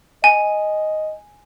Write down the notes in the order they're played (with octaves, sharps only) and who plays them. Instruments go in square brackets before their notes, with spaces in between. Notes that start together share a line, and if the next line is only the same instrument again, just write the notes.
[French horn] D#5 [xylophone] G#5